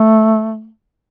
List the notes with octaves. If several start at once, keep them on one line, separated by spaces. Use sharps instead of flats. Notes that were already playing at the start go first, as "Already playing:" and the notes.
Already playing: A3